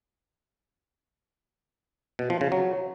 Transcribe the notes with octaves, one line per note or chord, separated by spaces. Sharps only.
B2
F3
C#3
F#3